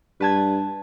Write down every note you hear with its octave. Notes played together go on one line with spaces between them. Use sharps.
G2 B4 A5 G#6